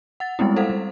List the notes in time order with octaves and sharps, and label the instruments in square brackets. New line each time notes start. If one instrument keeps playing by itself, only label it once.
[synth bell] F#5 A6
G3 G#3 B3 C4 E4
A4 C5 F5 F#5
G3